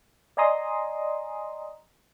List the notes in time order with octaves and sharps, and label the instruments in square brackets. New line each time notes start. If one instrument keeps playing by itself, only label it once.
[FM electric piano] D5 D#5 G#5 A#5 C6 D#6